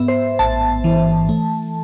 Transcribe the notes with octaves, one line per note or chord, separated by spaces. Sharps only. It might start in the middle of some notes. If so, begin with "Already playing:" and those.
Already playing: G#2 B3 E5
C5
A1 A5
E3
A3